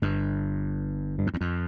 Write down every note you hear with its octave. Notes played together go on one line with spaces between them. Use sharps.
G1 G2
G2
F2
E2
F2